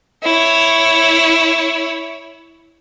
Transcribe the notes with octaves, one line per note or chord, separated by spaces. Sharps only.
E4 C#5